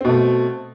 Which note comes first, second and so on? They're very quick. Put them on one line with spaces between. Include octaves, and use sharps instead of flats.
C4 B2 A3